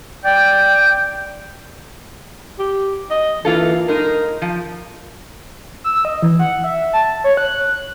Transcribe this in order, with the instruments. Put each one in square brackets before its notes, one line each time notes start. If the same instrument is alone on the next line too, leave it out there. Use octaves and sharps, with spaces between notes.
[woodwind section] D5 G5
[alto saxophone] G4
D#5
[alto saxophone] E3 [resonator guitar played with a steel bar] A#3 F4 A4
[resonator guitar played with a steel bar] G#3 D#4 [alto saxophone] A#4
[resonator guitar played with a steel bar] F3
[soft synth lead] E6
D#5
E3
F#5
E5
A5
C#5
F#6